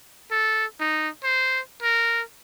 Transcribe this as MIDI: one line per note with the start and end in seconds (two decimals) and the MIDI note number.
0.32 0.65 69
0.80 1.09 63
1.24 1.61 72
1.83 2.23 70